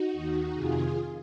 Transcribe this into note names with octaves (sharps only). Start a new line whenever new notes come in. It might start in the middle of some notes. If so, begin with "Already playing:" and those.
Already playing: D#4 F#4
D#2 D#3
F2 C3 D#3 F4 G#4